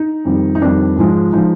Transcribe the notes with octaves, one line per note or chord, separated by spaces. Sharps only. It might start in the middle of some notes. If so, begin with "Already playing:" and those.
Already playing: D#4
F2 D#3 G3
D#4
F2 D#3 G3 D4
G#2 F3 G#3
F3 G#3 D#4